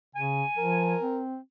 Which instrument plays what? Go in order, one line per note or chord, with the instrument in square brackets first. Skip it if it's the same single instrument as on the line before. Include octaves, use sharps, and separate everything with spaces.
[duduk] C#3 [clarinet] G#5
[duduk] F3 [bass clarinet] A#4
[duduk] C4